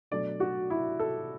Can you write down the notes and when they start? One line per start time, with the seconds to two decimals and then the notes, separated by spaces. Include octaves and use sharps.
0.11 B2 F#3 A3 D4 D5
0.40 F#4
0.70 E4
1.00 A4